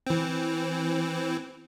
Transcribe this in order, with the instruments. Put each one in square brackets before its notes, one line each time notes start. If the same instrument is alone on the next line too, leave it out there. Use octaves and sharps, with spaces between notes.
[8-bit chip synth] E3 C4